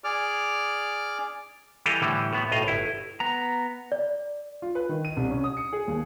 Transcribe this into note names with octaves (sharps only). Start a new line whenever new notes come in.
G#4 D5 D6 F6
E3 G3 G4 A4 D#5 F5
A2 D3 E3 G3
A2 B3
B1 A2 D#5 F5
G1 E4
B3 A#5
D5
F4
B4
D#3
D#7
C2
C#4
D#6
C#7
G#4
D#2